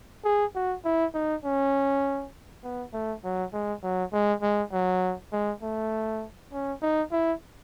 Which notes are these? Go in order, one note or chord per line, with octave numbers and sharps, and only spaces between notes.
G#4
F#4
E4
D#4
C#4
B3
A3
F#3
G#3
F#3
G#3
G#3
F#3
G#3
A3
C#4
D#4
E4